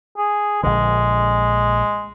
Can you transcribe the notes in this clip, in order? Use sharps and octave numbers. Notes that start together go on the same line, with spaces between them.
G#4
A#1 D3 G#3